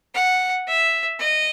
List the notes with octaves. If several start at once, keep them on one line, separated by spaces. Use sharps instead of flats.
F#5
E5
D#5